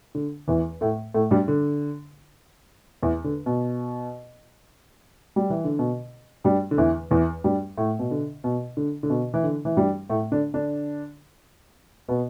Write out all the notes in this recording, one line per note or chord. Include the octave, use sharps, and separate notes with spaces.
D3
E2 E3
A2 A3
A2 A3
G2 G3
D3
E2 E3
D3
B2
G3
E3
D3
B2
G2 G3
D3
E2 E3
E2 E3
G2 G3
A2 A3
B2
D3
B2
D3
D3
B2
E3
D3
E3
G2 G3
A2 A3
D3 D4
D3 D4
B2 B3